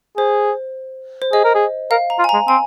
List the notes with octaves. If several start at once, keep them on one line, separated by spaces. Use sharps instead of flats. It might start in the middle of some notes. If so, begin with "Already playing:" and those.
G#4 C5
C5
G#4 D#5
A#4
G#4
A#4 F5
A#5
F4
G#5
A#5
G#3
C4 G#5